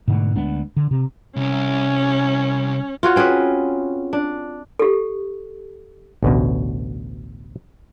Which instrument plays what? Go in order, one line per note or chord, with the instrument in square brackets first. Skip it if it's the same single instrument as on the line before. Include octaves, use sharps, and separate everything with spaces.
[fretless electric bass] G#2 B2 D3 A3
D2 G#3 B3 D4
D3
C3
[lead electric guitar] C2 [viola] C#4
[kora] F4 F#4 C#5
C4 C#4 G#4 B4
D4
[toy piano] G4 A4
[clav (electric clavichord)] A1 D2 B2